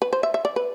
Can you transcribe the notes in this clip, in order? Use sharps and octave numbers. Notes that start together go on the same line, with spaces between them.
B4
C5
E5
E5
D5
B4